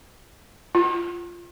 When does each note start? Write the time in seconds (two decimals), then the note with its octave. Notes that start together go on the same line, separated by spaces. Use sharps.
0.75 F4